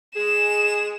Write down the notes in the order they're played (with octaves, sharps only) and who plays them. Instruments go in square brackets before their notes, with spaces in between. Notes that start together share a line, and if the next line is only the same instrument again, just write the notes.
[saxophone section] G#3 G#4 [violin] E7